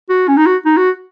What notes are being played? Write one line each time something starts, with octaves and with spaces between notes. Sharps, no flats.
F#4
C#4
D#4
F#4
D#4
F#4